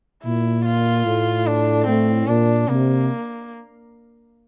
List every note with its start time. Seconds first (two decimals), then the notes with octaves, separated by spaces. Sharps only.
0.24 A#2 E4
0.66 F4
1.06 A2
1.47 D4
1.87 A2 C4
2.27 A#2 D4
2.68 C3 A#3